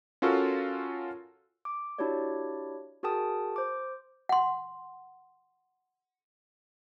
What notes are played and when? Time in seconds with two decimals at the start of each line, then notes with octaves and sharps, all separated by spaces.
0.22 C#4 F4 F#4 A4 A#4
1.65 D6
1.98 D4 E4 F#4 G4 C#5 D5
3.03 F#4 G#4 A#4 G5 A5 D#6
3.56 C5 D6
4.29 F#5 C6